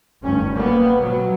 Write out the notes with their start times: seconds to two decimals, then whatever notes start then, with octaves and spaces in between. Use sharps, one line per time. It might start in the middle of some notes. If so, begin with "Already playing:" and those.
0.22 F1 D2 G2 C#4
0.53 G3 A#3 B3
0.98 B2 F#3